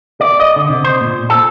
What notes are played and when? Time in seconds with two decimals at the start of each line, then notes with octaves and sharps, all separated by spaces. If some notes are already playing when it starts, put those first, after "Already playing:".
0.21 D5
0.40 D#5
0.56 D3
0.70 C3
0.84 C5
1.01 A#2
1.30 A4